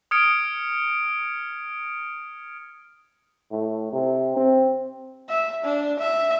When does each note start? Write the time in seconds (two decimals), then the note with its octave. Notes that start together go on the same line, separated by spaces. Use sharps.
0.11 D#6 F6 G#6 C#7 D7
3.51 A2
3.92 C3
4.37 C4
5.29 E5
5.64 D4
5.99 E5